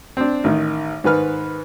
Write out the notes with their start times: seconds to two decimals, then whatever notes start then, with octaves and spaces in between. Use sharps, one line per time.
0.17 C4 D4
0.44 A1 D#3
1.04 G#2 D#3 B4 F6